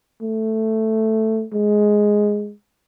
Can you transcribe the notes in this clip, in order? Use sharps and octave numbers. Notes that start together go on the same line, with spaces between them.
A3
G#3